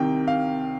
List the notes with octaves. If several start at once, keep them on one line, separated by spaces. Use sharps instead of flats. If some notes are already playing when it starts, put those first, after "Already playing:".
Already playing: C2 C3 D#3 G5
F5